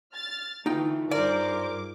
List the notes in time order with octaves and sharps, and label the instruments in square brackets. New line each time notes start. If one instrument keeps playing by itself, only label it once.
[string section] F6 A6
[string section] D3 E3 A3 [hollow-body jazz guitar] D#4 F4 G5
[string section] G2 G#4 D6 [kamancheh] A#4 C5 [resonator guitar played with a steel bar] D5